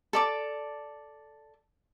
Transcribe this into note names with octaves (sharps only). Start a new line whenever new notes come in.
A4 D5 D6